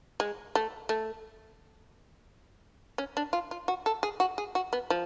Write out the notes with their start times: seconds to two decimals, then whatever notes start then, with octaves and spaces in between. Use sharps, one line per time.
0.20 G#3
0.55 A3
0.89 A3
2.98 C#4
3.17 D4
3.33 F4
3.51 F4
3.68 F#4
3.86 A4
4.03 G#4
4.20 F#4
4.38 G#4
4.55 F#4
4.73 B3
4.90 F3